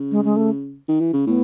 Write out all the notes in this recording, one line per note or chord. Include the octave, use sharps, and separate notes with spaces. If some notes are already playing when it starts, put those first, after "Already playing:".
Already playing: C#3
G#3
G#3
A3
D#3
E3
C#3
A2 B3